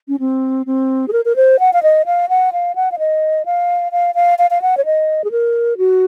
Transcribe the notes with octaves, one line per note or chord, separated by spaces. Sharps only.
C#4
C4
C4
G#4
A#4
A#4
C5
F#5
F5
D#5
F5
F#5
F5
F#5
F5
D#5
F5
F5
F5
F5
F5
F#5
C#5
D#5
G#4
A#4
F#4